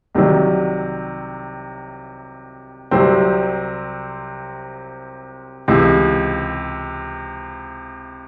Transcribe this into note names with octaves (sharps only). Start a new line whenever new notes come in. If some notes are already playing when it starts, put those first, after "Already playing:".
C2 C3 D#3 F#3
C2 C3 F#3 C4
C#2 C3 E3